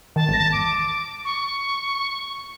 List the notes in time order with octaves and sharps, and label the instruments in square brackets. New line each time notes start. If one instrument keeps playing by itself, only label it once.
[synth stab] D#3 [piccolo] A5
[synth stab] G#1 E2 A#6
[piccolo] D6
C#6